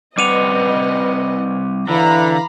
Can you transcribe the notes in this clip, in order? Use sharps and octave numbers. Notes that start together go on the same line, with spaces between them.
G3 C4 B4 D#5 F#5 D6 D#7 F7
D3 E3 F5 A#5 B5